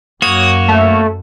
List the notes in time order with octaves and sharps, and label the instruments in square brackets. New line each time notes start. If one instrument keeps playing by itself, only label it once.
[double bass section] F#2 [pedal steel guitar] A#3 F#4 C#5 [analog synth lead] D#6
[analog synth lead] A3